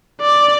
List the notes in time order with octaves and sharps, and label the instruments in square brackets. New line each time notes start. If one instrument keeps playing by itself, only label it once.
[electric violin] D5